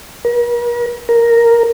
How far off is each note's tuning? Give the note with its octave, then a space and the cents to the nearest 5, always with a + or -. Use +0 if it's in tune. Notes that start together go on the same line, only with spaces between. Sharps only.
A#4 +45
A#4 +0